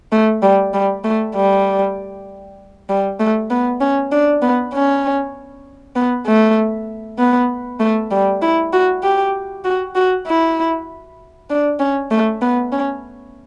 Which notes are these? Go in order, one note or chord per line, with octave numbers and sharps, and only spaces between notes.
A3
G3
G3
A3
G3
G3
A3
B3
C#4
D4
B3
C#4
B3
A3
B3
A3
G3
E4
F#4
G4
F#4
F#4
E4
D4
C#4
A3
B3
C#4